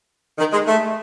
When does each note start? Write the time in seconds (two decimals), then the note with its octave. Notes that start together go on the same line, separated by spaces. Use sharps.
0.38 D#3
0.52 G#3
0.67 A3